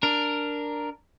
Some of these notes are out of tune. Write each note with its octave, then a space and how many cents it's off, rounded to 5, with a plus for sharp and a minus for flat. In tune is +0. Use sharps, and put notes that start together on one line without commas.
D4 +0 A#4 +0